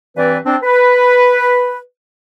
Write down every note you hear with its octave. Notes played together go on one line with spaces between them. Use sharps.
G2 E3 C4 B4 D5
C4 D4
B4